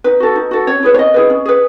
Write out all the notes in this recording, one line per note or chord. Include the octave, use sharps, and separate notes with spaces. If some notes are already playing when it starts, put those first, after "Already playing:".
D#4 B4
F#4 A4
D#4
F#4 A4
C#4 C#5
E4 G#4 B4
C#5
C#4 D#5
E4 G#4 B4
C#4
G#4 B4